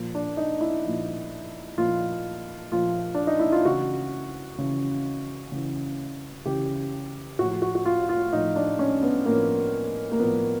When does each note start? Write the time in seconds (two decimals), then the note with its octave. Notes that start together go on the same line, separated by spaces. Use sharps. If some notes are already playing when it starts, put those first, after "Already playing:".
Already playing: A#2 F3
0.15 D4
0.37 D#4
0.61 E4
0.84 A#2 F3
1.78 A#2 F3 F4
2.72 A#2 F3 F4
3.15 D4
3.27 D#4
3.39 E4
3.52 F4
3.65 C#3 E3 F#4
4.58 C#3 E3
5.52 C#3 E3
6.45 C#3 E3 G4
7.39 A2 F#4
7.44 F3
7.62 F#4
7.75 F#4
7.85 F4
8.09 F4
8.33 A2 F3 D#4
8.56 D4
8.79 C#4
9.03 B3
9.26 A2 F3 A#3
10.12 A#3
10.19 A2 F3 B3